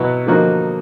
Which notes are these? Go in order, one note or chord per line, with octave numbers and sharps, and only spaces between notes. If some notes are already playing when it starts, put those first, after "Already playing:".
Already playing: B2 F#3 B3 E4
D3 F3 A#3 D#4 F#4